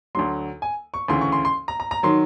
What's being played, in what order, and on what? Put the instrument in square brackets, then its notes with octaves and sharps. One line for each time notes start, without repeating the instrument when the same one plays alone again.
[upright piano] D2 D3 F#3 C6
G#5
C#6
D2 C#3 E3 C6
C#6
C6
C6
A#5
A#5
A#5
D#3 F#3 C6